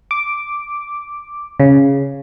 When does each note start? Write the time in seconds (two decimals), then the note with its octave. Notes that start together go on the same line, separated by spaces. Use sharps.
0.11 D6
1.60 C#3